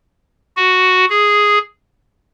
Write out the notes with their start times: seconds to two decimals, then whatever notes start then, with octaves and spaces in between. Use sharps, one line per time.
0.57 F#4
1.10 G#4